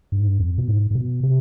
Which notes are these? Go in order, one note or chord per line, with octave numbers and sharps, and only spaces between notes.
G2
G#2
G2
F2
B2
G#2
G#2
B2
C3